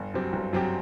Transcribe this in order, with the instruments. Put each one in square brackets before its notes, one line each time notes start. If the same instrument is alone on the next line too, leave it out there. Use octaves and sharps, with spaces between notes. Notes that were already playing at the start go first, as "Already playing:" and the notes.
Already playing: [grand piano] G1
F#2 F#3 C4 G4
G1
F#2 F#3 C4 G4